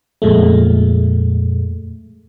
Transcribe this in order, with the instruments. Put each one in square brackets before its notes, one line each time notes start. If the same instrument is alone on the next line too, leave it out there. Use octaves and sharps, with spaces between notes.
[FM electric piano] F2 A#2 G#3 A3